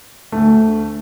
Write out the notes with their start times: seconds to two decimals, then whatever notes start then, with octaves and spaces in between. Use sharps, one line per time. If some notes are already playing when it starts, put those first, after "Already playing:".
0.32 D2 D3 A3